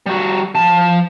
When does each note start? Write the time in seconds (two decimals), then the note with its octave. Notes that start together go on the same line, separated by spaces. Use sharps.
0.06 G3 F#4
0.55 F3 A5